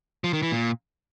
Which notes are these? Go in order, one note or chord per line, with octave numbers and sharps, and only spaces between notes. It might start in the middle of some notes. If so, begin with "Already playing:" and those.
F3
D#3
E3
A#2